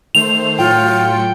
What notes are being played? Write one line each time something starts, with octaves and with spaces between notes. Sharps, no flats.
D#3 A3 C5 F7
A2 F#3 F4 G5 C#7